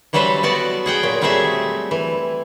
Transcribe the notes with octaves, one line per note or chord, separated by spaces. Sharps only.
E3 F#3 G3 A4 B4 C5
B3 F#4 D5 A5
G#4 F#5 G5
A#2 F#3
F#3 G3 A3 C4 G#4 E5
E3